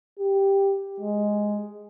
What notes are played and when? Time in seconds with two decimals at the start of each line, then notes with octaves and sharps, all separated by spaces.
0.19 G4
1.00 G#3